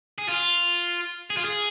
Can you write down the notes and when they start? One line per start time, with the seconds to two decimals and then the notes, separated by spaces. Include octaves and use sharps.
0.18 G#4
0.28 F4
1.30 G#4
1.37 F4
1.45 G#4